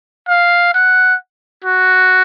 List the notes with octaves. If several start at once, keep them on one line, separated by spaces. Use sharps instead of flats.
F5
F#5
F#4